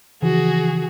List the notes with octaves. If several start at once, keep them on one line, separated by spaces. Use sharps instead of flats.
C#3 E3 F3 F#4 G#4